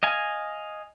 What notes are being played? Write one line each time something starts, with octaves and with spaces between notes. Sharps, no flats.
D#5 F5 G#5